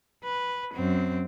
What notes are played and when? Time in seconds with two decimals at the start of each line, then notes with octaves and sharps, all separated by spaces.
0.24 B4
0.74 F#2 C4